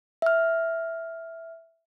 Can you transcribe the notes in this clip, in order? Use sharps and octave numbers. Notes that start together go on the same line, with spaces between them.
E5 F6